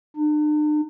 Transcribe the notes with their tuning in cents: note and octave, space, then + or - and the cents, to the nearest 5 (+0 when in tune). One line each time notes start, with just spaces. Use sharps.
D4 +45